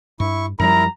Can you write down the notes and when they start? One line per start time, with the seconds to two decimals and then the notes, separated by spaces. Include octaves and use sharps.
0.20 G2 E4 C#6
0.59 F#2 F3 G3 E4 A#4 A#5